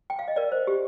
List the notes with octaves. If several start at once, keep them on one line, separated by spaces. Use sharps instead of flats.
G5
F5
D#5
A#4 D5
C5
G4